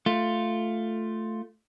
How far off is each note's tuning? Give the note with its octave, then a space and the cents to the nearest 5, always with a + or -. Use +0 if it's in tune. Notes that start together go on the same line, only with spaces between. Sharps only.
A3 +0 F4 +0